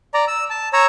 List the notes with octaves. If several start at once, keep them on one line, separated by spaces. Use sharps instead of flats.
D5 A#5
E6
A5
C#5 A#5 E6